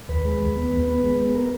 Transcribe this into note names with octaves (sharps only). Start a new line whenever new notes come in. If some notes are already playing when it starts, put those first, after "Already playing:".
D#2 B4
G#3
D#2
B3
D#2
B3
G#3
B3
A#4